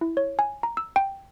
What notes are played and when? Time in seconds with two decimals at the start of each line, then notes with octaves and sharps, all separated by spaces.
0.01 E4
0.17 C#5
0.39 G#5
0.63 A#5
0.77 E6
0.96 G5